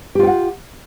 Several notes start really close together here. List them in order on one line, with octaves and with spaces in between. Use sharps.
G4 F4 G5 F#5